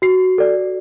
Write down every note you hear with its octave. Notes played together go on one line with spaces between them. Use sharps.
F#4 C7
A4 D5